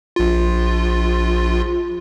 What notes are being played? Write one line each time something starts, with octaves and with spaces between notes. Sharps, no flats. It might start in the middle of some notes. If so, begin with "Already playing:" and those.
A#1 F4